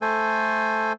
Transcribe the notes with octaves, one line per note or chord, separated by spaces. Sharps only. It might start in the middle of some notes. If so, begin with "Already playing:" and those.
A3 A4 C5 G#5